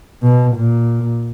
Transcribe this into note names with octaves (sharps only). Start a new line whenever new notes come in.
B2
A#2